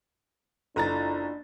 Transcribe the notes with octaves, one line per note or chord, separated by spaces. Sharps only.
F#1 D4 E4 F4 A4 A#5 A6